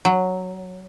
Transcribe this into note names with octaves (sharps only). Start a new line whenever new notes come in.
F#3